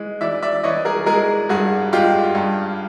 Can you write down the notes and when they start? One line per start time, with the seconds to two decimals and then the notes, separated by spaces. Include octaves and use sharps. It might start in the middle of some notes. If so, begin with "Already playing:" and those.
Already playing: E3 G#3
0.21 E3 D5 E5
0.42 D5 E5
0.64 E3 C#5 D#5
0.85 G#4 A#4
1.06 G#3 G#4 A#4
1.49 G2 F#4 G#4
1.93 G#3 F4 G4
2.35 G2